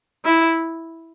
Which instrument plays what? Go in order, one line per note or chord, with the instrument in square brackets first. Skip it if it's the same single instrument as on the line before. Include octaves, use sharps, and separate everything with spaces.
[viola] E4